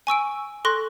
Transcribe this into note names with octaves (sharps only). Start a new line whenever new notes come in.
G#5 C#6 E6 D7
A4 C6 C#6 F#6 A#6